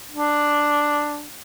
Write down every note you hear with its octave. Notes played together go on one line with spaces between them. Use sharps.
D4